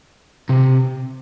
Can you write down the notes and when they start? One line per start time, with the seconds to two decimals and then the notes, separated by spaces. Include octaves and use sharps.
0.49 C3